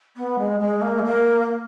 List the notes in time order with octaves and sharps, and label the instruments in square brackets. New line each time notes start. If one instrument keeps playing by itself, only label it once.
[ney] B3
G#3
G#3
A#3
G#3
A#3